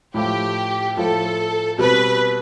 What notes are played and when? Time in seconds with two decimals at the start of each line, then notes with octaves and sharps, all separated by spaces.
0.14 A2 F3 A3 G4
0.97 A2 F3 A3 A4
1.78 B2 G3 C4 B4